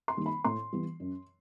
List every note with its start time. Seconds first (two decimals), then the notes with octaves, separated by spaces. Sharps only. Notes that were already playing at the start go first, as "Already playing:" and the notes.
0.08 C6
0.17 D#3 G3 A#3
0.26 B5
0.44 A2 C6
0.72 E3 G3 B3
1.00 F#2